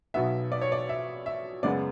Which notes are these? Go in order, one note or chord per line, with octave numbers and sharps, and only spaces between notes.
B1 B2 F#3 B3 E5
D5
C#5
D5
E5
E5
F#2 C#3 G#3 B3 D5